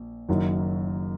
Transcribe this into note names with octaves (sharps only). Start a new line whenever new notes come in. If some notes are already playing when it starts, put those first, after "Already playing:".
Already playing: A#1
F#1 F#2 D#3 F#3